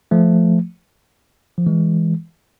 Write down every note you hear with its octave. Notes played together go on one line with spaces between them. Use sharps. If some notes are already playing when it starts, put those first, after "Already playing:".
F3 A3
F3
E3 G#3